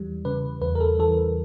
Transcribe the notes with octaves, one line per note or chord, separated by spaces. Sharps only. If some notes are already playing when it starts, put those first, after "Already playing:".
Already playing: E2 E3 G3
C#3 B4
E2 B4
A#4
A4
E3 A4